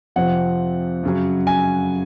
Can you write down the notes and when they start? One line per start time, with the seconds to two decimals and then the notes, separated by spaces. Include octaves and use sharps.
0.16 F2 C3 F3 C4 F#5
1.03 F#2 C#3 F#3
1.47 G#5